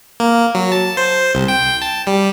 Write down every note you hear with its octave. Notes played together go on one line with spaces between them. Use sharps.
A#3
F#3
A5
C5
C2
G5
A5
G3